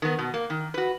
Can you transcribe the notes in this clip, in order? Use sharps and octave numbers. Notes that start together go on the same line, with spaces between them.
D#3 B3
B2
A#3
D#3
F#4 B4